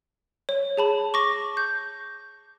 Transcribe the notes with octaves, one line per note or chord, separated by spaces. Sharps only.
C#5
G#4 A5 B5
C#6 D6 A#6
G6